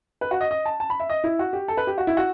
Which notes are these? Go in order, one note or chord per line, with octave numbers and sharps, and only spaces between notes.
B4
F#4
D#5
D#5
A5
A5
B5
E5
D#5
E4
F#4
G4
A4
B4
G4
F#4
E4
F#4